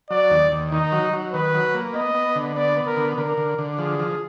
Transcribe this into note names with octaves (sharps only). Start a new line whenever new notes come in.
F#3 D5
D#2
D#2
D#3 D#4
F#3
F#3
D#3 B4
F#3
A#3
B3 D#5
B3
D3
B3 D5
B3
A#4
D3
D3 A#4
D3
D3
F3 G#4
F3